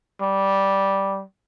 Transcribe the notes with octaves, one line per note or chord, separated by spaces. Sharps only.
G3